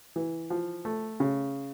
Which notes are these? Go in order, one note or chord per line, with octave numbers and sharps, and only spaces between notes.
E3
F3
A3
C#3